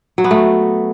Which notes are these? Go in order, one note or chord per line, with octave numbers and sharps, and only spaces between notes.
F#3
B3
A3